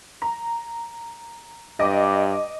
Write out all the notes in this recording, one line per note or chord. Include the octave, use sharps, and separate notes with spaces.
A#5
G2 D#5 D6